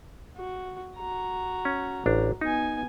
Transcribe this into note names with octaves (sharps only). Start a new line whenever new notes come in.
F#4
F#4 A#5
C#4
A1 D4
B3 D#4 G#5